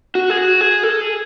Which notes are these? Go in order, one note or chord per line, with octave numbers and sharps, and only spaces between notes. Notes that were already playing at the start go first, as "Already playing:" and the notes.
F#4
G#4
F#4
G#4
A4
G#4